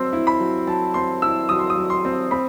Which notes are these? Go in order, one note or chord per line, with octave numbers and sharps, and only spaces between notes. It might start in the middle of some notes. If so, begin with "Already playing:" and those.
Already playing: F#3 C4 C6 E6
E4
B5
F#3
F#3 A5
C4 C6
E4 E6
F#3 D#6
C6
D#6
F#3
C6
C4
C4 B5